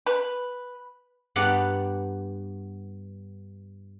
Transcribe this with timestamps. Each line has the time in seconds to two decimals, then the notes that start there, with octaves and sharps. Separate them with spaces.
0.06 B4
1.36 G2 B3 G4 D5 F#5 A#5